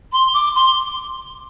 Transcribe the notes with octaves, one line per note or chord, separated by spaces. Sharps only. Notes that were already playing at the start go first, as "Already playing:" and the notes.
C6
D6
C6